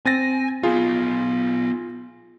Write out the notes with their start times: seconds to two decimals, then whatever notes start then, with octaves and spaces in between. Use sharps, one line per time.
0.05 C4 G#5 A6 A#6
0.63 B3 D#4 F4 G#4